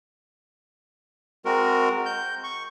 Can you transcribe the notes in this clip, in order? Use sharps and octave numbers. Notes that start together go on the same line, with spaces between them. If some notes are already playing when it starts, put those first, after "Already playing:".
G#3 C4 F#4 A#4
G6
C#6